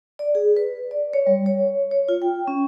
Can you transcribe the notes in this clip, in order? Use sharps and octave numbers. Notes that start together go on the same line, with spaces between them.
D5
G#4
B4
D5
C#5
G3
C#5
C#5
F4
G5
C#4